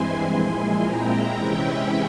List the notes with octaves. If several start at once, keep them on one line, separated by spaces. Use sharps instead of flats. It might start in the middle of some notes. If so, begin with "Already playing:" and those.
Already playing: G2 E3 G#3 C4 E4 G#5 C6
A#2 F3 G#3 E4
A#2 G#3 C4 E4 G5 A#5
C3 E3 G#3 C#4 E4 E5 G5